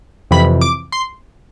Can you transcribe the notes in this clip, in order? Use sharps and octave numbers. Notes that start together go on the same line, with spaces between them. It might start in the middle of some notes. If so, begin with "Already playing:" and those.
F2 C3 E3 B5
D6
C6